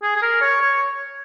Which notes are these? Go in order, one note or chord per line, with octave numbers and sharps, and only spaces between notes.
G#4
G#4
A#4
C#5
C#5